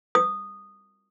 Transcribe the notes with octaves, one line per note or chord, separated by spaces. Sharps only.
D#6